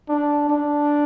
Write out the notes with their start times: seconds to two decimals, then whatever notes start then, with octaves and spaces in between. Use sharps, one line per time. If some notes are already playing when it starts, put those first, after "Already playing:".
0.09 D4
0.50 D4